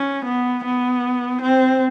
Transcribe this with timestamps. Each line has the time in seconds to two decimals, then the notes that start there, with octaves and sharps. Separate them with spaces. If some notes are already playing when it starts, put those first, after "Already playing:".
Already playing: C#4
0.25 B3
0.64 B3
1.42 C4